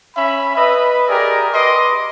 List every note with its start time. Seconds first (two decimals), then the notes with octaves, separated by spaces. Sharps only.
0.16 C#4 E5 B5
0.56 B4 D#5 E5 B5
1.08 G4 G#4 A#4 D5 D#5
1.53 B4 D#5 C6 D6